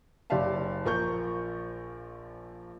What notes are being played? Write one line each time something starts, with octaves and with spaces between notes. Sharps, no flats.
F#1 G4 D5 E5 F5 A5
A#1 F3 A#4 C#6 G6